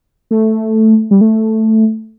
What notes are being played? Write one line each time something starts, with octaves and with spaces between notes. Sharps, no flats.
A3
G3
A3